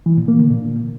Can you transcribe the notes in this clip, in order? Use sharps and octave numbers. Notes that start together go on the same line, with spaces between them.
E3
A#2
A#3
D3
A#2